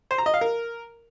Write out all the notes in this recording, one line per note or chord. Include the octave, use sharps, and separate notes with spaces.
C5
A#5
D#5
F5
A#4